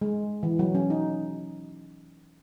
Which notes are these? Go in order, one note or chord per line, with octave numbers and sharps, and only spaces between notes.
G#3
E3
F#3
C#4
D#4